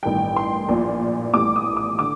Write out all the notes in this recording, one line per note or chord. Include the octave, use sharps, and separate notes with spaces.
A1 G2 D#3 G3 G5
C6
A#1 A#2 F3
A1 A2 G3 D6
D#6
D6
D3 D6